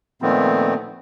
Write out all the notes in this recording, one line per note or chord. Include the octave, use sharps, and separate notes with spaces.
A#2 D#3 F3 A3 B3 C4